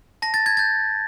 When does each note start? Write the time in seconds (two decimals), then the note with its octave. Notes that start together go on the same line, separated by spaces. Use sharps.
0.22 A5 A#6
0.34 A6
0.46 G#6
0.57 G6 A6